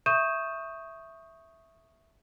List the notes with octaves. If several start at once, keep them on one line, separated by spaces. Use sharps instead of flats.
E5 C#6 D#6 G6 D#7 E7